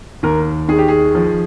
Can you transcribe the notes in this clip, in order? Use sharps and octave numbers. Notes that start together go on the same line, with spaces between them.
D#2 A#4
D#3 G#4
G4
G#4
F3